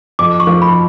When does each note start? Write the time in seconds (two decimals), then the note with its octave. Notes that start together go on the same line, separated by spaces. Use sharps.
0.19 F2 D6
0.40 C#6
0.47 F3
0.62 B5